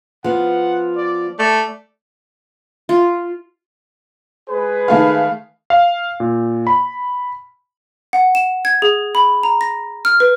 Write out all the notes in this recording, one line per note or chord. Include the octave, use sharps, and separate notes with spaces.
F3 B3 F#5
D5
A3 D5
F4
G#3 G#4 B4
D#3 A3 F5
F5
A#2
B5
F#5
E7
G#6
G#4
B5
A#5
A#6
F6
B4